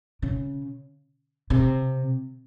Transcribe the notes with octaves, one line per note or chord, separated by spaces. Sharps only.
C#3
C3